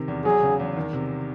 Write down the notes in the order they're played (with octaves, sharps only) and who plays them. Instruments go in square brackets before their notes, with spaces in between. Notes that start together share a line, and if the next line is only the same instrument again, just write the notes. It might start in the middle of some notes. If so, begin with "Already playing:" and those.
Already playing: [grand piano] C3 D#3
E2
[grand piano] F#3 [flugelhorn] G#4
[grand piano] C#3
E2
D#3
C3